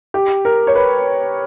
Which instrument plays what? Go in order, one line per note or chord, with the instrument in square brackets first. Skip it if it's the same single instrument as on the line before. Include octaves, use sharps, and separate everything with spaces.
[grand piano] G4
A#4
C#5
B4